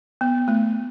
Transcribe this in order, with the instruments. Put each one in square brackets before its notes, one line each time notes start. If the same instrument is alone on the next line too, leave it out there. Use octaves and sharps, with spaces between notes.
[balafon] B3
A3